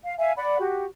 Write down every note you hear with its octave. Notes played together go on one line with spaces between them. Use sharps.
F5
E5 F5 G#5
D5 F#5 B5
F#4 G4